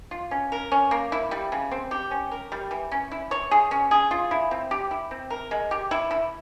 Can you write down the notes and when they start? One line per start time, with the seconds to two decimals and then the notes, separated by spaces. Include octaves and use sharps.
0.11 F4
0.31 C#4
0.52 A#4
0.72 C#4
0.91 A#3
1.12 E4
1.31 G3
1.52 C#3
1.71 C4
1.91 G4
2.11 C#4
2.31 A#4
2.52 G3
2.71 E3
2.92 C#4
3.12 E4
3.31 C#5
3.51 G#4
3.71 C#4
3.91 G#4
4.11 F4
4.31 E4
4.51 C4
4.71 G4
4.91 E4
5.11 C4
5.30 A#4
5.51 G#3
5.71 G4
5.91 E4
6.11 E4